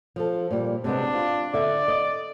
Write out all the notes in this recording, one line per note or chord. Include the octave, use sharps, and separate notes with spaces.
F3 A4
A#2 F3 G3
C3 G#3 B3 D4
F4
D3 D5 E5
D#5